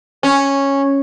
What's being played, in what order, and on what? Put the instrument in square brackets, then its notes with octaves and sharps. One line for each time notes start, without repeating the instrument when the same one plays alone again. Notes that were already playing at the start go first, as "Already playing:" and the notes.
[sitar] C#4